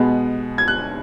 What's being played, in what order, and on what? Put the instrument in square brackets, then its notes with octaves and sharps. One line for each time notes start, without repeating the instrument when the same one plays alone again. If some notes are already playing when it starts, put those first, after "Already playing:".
Already playing: [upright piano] B2 G#3 B3
G#6
F#6